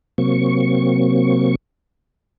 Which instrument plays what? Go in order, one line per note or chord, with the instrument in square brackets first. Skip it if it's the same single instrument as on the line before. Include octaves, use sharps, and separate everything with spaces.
[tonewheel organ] C3 F#3 A#3 C4 C#6